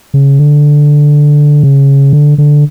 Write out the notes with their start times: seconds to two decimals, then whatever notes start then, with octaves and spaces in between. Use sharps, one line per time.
0.14 C#3
0.39 D3
1.63 C#3
2.13 D3
2.38 D3